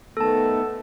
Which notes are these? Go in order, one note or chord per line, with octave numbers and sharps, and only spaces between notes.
D#3 A3 B3 A4 A5